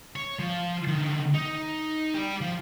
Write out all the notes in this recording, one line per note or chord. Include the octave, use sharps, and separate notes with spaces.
C#5
F3
D3 D#3
D#4
G4 D5
F3